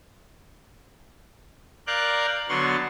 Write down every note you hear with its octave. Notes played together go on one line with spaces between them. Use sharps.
A#4 D5 F5 F#6 G6
D3 F#3 B3 C6 C#6 A6